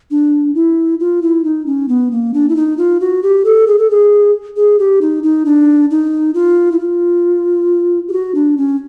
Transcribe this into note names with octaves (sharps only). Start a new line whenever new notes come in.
D4
E4
F4
E4
D#4
C#4
B3
A#3
D4
E4
D#4
F4
F#4
G4
A4
G#4
A4
G#4
G#4
G4
D#4
D#4
D4
D#4
F4
E4
F4
G4
F#4
D4
C#4